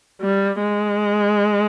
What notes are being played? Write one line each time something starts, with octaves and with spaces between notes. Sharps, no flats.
G3
G#3